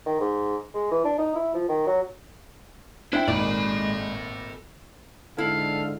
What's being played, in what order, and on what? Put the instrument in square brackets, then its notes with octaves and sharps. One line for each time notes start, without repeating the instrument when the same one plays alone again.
[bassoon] D#3
G#2
G#3
E3
D4
D#4
E4
F3
D#3
F#3
[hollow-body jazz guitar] D4 [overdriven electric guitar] E4 [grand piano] C5 E5 G5
[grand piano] G#1 A#2 D#4 [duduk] G#3 [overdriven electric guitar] A4 B5 [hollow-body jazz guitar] D5
[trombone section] G#2 D3 [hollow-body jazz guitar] E4 [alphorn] A4 [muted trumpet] F5